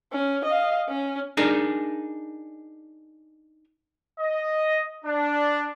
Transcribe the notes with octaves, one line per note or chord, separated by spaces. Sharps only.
C#4
D#5 F5
C#4
D4 D#4 G#4 A#4
D#5
D4